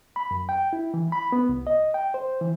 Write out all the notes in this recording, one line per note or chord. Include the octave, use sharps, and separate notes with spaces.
B5
F#2
G5
E4
E3
B5
B3
C2
D#5
G5
C5
E3